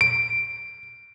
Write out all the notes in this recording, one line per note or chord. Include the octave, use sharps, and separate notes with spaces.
D7